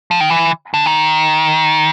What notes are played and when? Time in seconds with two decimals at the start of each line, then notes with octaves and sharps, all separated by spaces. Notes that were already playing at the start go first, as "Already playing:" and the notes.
0.11 F3
0.20 D#3
0.30 E3
0.74 D3
0.86 D#3